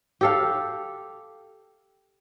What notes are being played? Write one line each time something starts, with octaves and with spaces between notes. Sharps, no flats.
G4 A4 F5